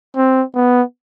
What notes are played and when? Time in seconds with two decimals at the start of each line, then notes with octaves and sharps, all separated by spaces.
0.16 C4
0.55 B3